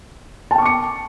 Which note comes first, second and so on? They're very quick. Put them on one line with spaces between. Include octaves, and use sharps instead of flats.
A5 G5 C#6 D6 C#7